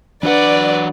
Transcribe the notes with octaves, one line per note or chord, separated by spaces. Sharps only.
E3 F#3 D4 B4 D5 F#5